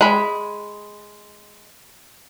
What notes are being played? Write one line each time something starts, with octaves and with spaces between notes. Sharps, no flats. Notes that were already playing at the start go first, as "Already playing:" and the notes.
G#3 B5